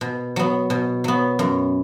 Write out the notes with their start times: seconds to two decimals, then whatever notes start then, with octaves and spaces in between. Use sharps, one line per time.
0.01 B2
0.36 F#3 B3
0.70 B2
1.04 F#3 B3
1.39 F#2